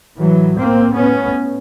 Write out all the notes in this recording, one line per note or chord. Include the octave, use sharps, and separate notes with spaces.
A2 E3 F#3
A#3 C4
A2 B3 C#4